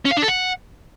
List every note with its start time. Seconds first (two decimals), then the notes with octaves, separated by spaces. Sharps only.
0.05 C#4
0.11 F5
0.17 D4
0.22 A4
0.28 F#5